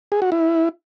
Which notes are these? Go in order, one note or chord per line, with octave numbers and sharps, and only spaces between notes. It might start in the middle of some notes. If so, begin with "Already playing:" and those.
G#4
F#4
E4